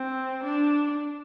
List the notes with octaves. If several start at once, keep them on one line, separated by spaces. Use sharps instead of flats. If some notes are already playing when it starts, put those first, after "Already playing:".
Already playing: C4
D4